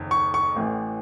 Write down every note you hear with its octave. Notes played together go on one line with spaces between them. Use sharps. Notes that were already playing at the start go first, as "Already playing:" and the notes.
Already playing: F#1 F2 D#3
C#6
C#6
A1 A2 E3